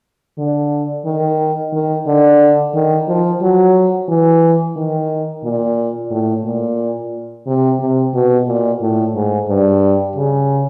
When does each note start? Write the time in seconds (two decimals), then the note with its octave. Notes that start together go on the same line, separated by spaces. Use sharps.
0.38 D3
1.05 D#3
1.73 D#3
2.07 D3
2.74 D#3
3.08 F3
3.42 F#3
4.09 E3
4.76 D#3
5.44 A#2
6.11 A2
6.45 A#2
7.47 C3
7.80 C3
8.14 B2
8.48 A#2
8.82 A2
9.15 G#2
9.48 G2
10.16 C#3